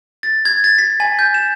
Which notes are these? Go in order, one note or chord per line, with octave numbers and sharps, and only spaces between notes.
A6
G#6
A6
B6
G#5
G6
E7